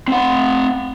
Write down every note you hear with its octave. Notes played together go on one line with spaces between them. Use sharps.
C4 F#5